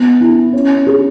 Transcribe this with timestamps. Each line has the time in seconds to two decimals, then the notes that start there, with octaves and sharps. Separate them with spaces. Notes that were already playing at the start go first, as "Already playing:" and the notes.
Already playing: B3
0.21 E4
0.53 C#4
0.87 G#4